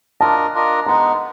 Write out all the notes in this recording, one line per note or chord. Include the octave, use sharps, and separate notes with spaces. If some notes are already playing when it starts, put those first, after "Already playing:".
D4 F4 A#4 D#5 A5
D4 F4 A#4 D#5
G#3 B3 D#4 A#5